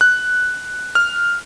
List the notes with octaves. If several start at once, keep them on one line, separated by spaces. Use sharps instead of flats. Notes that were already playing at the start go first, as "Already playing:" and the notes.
F#6
F6